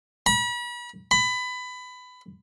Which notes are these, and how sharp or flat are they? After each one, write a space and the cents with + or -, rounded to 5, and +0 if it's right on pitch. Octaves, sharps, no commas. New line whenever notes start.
B5 -40
B5 +20